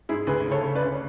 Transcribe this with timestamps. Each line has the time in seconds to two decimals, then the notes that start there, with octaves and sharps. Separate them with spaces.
0.09 G#2 E4 G#4
0.27 D2 G#4 B4
0.45 C#3
0.52 A4 C#5
0.64 C#3
0.75 B4 D5
0.82 D2